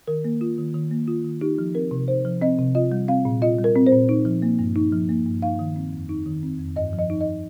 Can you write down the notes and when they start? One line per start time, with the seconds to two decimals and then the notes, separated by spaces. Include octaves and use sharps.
0.08 D#3 A#4
0.25 A#3
0.41 F4
0.58 D#3
0.74 D#3
0.91 A#3
1.08 F4
1.24 D#3
1.41 D#4 G4
1.58 F3
1.75 C4 A#4
1.91 C3
2.08 D#4 C5
2.25 F3
2.41 C4 D#5
2.58 C3
2.75 F4 D#5
2.92 G3
3.09 C4 F5
3.25 A#2
3.42 F4 D#5
3.58 G3
3.64 A#4
3.76 C4
3.87 C5
3.92 A#2
4.09 D#4
4.25 F3
4.42 A#3
4.59 G2
4.76 D#4
4.92 F3
5.09 A#3
5.26 G2
5.42 D#4 F5
5.59 D#3
5.76 C4
5.93 F2
6.09 D#4
6.26 D#3
6.43 C4
6.59 F2
6.76 G2 D#5
6.93 F3
6.99 D#5
7.10 D#4
7.21 D#5